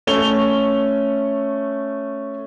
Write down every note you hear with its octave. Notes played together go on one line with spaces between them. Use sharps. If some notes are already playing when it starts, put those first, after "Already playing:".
A3 C#4 C#6 F7 G7